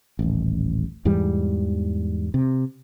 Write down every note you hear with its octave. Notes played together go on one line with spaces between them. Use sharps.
D#1 A1
E2 G#2 E3 G3
C3